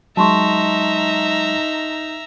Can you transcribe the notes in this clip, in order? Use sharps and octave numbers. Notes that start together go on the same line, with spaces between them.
F#3 G#3 D#4 E5 A5 A#5 C6 C#6